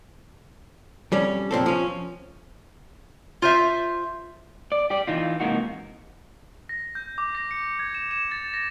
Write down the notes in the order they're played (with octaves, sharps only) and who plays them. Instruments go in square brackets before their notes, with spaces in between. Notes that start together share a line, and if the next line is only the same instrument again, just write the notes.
[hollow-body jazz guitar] F2 G3 C#4
F2 A#2 C4 A4
F3 C#4
[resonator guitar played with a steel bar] F4 C5 E5
[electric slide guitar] D5
G4 D5
E3 D#4 F4
G#2 C3 E3 A#3 D#4 F#4
[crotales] A#6
G6
D6
A#6
C#7
G#6
E7
E7
A6
A#6